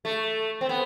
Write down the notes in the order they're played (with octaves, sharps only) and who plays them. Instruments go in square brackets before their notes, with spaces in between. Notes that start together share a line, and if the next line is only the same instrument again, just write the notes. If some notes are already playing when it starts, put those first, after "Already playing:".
[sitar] A3
C4
B3